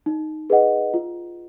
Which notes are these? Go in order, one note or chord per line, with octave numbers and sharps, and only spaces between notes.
D#4
G#4 B4 D#5 F#5
F4